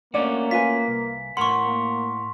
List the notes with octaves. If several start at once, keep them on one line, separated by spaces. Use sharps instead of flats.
A3 A#3 C#4 D4 F#4 D5
F4 B4 G#5 B6
C2
A2 A#4 F#5 C6 C#6
A#3